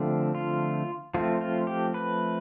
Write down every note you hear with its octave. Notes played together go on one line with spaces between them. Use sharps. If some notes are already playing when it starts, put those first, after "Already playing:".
Already playing: D3 F3 A3 C4
F4
F3 A3 C4 F4
F4
G4
B4